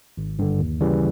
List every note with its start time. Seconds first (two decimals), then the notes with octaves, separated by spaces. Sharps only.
0.18 G#1
0.39 G2 D3
0.59 D#2
0.81 C#3 E3 G3